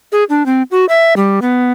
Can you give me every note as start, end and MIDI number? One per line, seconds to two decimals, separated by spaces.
0.12 0.24 68
0.29 0.45 62
0.46 0.63 60
0.71 0.86 66
0.89 1.14 76
1.17 1.40 55
1.42 1.72 59